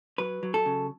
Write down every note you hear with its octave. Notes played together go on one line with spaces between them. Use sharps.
F#3 B4
F#3
A4
C#3